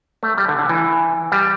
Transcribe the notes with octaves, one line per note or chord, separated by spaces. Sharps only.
A3
G3
D3
D3
E3
G3